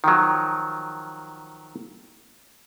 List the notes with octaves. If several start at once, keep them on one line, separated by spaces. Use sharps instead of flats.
D#3 F3 F#3